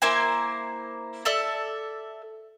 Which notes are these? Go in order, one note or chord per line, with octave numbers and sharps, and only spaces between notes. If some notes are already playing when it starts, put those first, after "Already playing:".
A#3 E4 C5 G#5
A4 D5 E5 A5